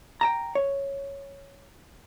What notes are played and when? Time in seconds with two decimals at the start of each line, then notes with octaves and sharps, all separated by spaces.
0.21 G5 A5 A#5
0.55 C#5